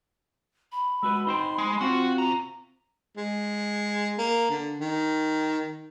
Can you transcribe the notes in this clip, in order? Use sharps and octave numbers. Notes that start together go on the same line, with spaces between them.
B5
G#3 F#4 B4 E6
D#4 C5 G5 C6
G#3
C4 F4 F#4 C5
C3 A#5
G#3
A#3
D3
D#3